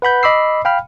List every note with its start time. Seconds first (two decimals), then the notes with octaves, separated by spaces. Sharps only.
0.02 B4 F#5 B5 G6
0.23 D#5 B5 D6 E6 C7
0.65 F5 G5 B5 F6